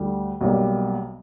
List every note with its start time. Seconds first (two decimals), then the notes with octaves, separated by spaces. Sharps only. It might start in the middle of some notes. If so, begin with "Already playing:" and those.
Already playing: D2 D3 G3
0.41 B1 B2 G3 A#3